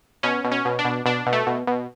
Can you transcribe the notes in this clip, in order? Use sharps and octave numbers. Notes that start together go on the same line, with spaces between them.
B2 C#4
B2
C#4
B2
D4
B2
B2 D4
B2
A3
B2
B2